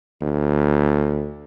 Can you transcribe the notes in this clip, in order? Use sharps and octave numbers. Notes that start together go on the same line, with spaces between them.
D2